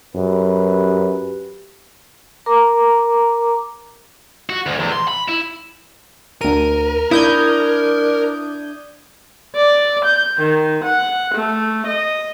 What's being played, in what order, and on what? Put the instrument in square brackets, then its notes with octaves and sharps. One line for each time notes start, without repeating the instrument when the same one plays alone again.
[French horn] F#2 [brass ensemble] G4 B4
[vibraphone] A#4 A#5 D6
[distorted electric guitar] F#4
D2
E2
C6
B5
E4
[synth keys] D2 D#7 [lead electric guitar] A#4
[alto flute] D4 [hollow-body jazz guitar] E4 [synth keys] D#6 G6 G#6
[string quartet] D5
G6
D#3
F#5
A3
D#5